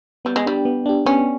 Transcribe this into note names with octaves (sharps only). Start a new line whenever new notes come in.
G3 B3
G#3
G3 D4 G4
B3
D4 G4
B3 C#4